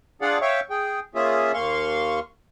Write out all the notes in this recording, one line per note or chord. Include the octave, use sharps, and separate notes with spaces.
D4 F4 G#4 D5 F5 F#5
C#5 E5 F5 G5 C#6
G#4 G5
A#3 C#4 F4 G#4 E5
D#2 A#3 F5 C6 C#6